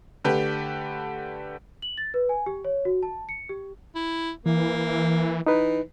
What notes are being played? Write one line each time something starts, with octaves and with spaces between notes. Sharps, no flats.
D3 A3 G4 B4
F#7
A6
B4
G#5
G4
C#5
F#4
A5
C#7
G4
E4
E3 A#3
E3 D#4 B4